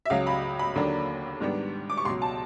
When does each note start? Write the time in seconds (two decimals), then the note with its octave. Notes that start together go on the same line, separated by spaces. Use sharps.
0.05 E5
0.10 C#2 C#3 F#3 F5
0.27 B5
0.59 B5
0.75 D#2 D3 F#3 A#3 D4
1.40 G#2 D#3 G3 B3 D4
1.90 D6
1.97 C#6
2.05 C#2 B2 F#3 C6
2.22 A5